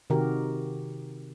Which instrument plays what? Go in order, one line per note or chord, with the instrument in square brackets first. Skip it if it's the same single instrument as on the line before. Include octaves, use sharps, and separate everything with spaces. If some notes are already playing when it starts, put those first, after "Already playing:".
[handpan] C3 D#3 F#4 G4 A#4